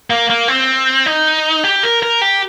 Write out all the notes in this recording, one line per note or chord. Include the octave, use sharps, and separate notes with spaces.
A#3
A#3
C4
D#4
G4
A#4
A#4
G4